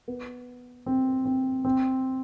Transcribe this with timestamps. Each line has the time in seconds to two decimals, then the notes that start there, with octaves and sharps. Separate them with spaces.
0.08 B3
0.86 C4
1.25 C4
1.65 C4